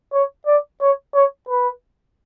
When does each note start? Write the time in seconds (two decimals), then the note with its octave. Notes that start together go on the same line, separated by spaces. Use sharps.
0.13 C#5
0.47 D5
0.81 C#5
1.15 C#5
1.49 B4